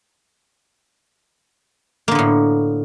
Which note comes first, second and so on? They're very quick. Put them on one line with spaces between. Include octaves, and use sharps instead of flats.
A#3 D3 B3 A2